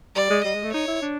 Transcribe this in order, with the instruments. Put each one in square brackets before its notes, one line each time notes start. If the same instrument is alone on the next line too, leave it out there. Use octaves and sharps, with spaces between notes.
[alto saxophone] G3 [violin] D5
[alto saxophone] G#3
[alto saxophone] G3 [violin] D#5
[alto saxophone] G#3
A3
[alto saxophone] D#4 [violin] C#5
[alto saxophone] E4
D4